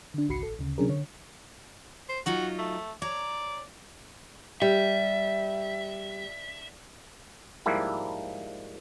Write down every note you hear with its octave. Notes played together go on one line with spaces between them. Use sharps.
D3 D4
G#1 C#2 F#4 B5 C7 C#7
A1 A4
D2 C#3
C3 F#3 C#4 D4 G#4 A#4
D3 C#5
C5
F#3 D#4 F4 F#4
A3
C#5 D5 A#5
G3 E5
G#2 F3 G3 A#3 E4